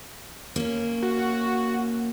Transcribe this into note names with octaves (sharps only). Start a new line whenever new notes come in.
A#3 C#4
F#4